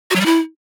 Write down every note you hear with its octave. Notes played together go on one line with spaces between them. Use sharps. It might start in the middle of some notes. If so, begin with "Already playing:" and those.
F#4
F#3
G3
E4